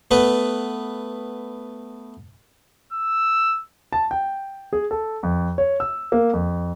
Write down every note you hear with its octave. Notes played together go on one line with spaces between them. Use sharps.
A3 B3 B4
E6
A5
G5
G#4
A4
F2
C#5
E6
A#3
F2